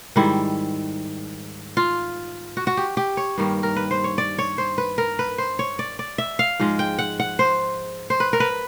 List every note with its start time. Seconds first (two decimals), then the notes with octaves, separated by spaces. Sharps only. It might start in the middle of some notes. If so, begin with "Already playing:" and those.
0.16 G#2 D#3 G3 E4
1.77 F4
2.57 F#4
2.67 F#4
2.77 G4
2.97 G4
3.17 C#5
3.38 G2 D#3 G3 A#3
3.63 A#4
3.76 B4
3.91 C5
4.04 C#5
4.18 D5
4.38 C#5
4.58 C5
4.78 B4
4.98 A#4
5.19 B4
5.38 C5
5.59 C#5
5.79 D5
5.99 D5
6.18 E5
6.39 F5
6.60 G#2 F3 G#3
6.79 G5
6.99 F#5
7.20 F#5
7.39 C5
8.10 C5
8.20 B4
8.33 A#4
8.40 B4